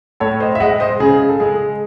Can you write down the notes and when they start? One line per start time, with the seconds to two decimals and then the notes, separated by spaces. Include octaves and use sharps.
0.20 A2 A4 C#5
0.40 C5 D#5
0.55 E5
0.60 G#3 D#5 F#5
0.80 C5 D#5
1.00 C#3 G#4
1.29 A4
1.40 G#3 G#4